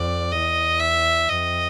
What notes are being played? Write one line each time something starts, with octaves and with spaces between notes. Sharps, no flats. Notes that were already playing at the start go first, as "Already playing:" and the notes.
Already playing: F2 D5
E2 D#5
E5
F2 D#5